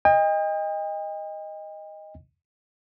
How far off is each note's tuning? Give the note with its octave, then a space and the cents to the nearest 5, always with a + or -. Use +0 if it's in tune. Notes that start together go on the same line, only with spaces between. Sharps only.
D#5 +0 G5 +45